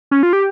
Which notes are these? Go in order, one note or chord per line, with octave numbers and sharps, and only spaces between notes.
C#4
F4
G4